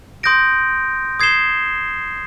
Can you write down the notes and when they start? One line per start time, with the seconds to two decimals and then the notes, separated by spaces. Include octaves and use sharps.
0.23 C6 D#6 G6 A#6 D7
1.20 D#6 G#6 C7 E7 G7